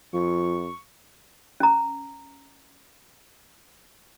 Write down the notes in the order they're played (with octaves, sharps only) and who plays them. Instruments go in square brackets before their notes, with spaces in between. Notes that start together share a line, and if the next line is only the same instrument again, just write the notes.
[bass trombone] F2 [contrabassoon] F3 [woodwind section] C#6
[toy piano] C#4 A#5